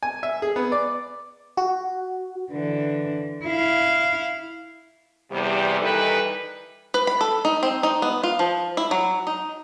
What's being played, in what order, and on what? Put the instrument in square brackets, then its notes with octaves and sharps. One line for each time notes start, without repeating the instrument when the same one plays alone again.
[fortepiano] G#5
E5
G#4
B3
D5
[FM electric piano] F#4
[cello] D3 E3
E4 F5
[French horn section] E2 C3 G3
D#3 E3 G3 D#4 A4 B4
[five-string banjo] B4
B5
A4
D#4
C4
D#4
B3
F4
F3
E4
F#3
D#4